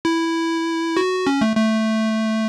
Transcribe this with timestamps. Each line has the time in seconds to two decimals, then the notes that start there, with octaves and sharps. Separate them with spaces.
0.05 E4
0.97 F#4
1.27 C#4
1.41 A3
1.57 A3